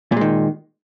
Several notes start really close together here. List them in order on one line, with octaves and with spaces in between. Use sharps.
A#2 G#3 D#3